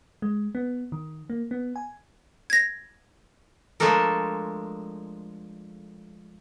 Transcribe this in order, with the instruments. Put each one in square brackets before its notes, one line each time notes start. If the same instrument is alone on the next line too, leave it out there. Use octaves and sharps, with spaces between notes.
[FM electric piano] G#3
B3
D#3
A#3
B3
G#5
[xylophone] G#6 A#6
[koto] F3 G#3 A3 D4 A4 A#4